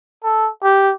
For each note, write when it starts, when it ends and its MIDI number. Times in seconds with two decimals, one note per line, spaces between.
0.23 0.50 69
0.63 0.92 67